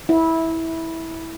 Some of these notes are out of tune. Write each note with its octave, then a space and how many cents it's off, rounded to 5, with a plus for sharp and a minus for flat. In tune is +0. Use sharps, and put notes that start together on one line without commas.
E4 -15